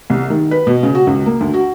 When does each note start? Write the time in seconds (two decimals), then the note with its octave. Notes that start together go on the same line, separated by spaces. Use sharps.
0.10 C2
0.30 D#3
0.51 B4
0.67 B2
0.83 C#3
0.95 F#4
1.07 C#2
1.26 A#3
1.41 D2
1.54 F#4